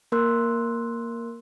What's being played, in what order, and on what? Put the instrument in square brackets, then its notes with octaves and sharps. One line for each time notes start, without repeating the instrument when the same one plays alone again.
[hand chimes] A#3 A#4 C6 E6 F#6